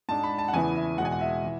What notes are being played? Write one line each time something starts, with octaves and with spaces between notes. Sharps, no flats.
G#2 G#3 D4 A5
B5
A5
F#5
E2 C#3 E3 B3 E4 G#5
E5
E2 B2 G#3 F#5
G#5
F#5
E5
E3